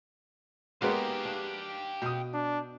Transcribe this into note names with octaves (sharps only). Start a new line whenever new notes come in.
G#3 A#3 B3 D#4 F#4 G4 F5
D4
B2 G5 D#6
D4